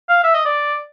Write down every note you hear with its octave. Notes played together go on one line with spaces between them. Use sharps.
F5
E5
D#5
D5